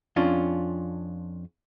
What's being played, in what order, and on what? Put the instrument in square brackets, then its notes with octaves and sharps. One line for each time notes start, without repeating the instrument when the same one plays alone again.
[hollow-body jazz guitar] F2 C#4 D4 F4